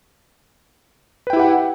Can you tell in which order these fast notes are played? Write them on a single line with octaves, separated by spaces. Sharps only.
B4 G5 E4 G4 F#5